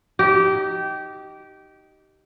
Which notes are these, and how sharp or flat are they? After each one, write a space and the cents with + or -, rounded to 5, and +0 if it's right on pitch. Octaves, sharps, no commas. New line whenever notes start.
D#4 +0 G4 -20